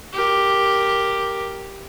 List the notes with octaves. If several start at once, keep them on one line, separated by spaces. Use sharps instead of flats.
G4 A#4